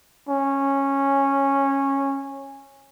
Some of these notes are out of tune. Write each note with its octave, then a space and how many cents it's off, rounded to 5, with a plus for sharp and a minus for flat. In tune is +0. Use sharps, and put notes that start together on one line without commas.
C#4 -10